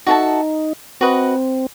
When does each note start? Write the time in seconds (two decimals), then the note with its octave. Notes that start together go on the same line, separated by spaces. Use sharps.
0.07 D#4 F#4 A4 E5 A5
1.01 C4 F#4 B4 D#5